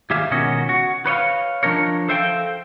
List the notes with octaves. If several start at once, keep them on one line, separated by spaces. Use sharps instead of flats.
D#2 D#3 G4 G#4 E5 F5
C#2 B2 D#3 C#4 F#4 D#5
F#4
B4 C#5 D#5 F5
F3 D4 D#4 A#4 C#5
A4 C5 E5 F5 G5